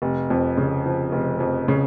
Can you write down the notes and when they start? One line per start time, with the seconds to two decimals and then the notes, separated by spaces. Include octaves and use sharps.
0.02 F1
0.30 F2
0.57 C#3
0.86 F3
1.12 F1
1.40 F2
1.68 C#3